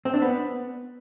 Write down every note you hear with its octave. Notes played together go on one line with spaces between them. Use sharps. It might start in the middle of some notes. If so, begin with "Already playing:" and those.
C4
D4
B3